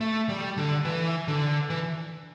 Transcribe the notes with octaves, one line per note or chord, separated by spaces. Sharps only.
A3
G3
D3
E3
D3
E3